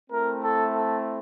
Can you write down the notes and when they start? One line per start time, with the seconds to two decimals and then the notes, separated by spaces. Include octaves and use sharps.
0.10 A3 C4 E4 A#4
0.42 A4
0.73 A4